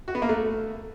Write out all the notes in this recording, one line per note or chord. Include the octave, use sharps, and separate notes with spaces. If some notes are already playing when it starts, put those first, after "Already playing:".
F#4
B3
A#3
A3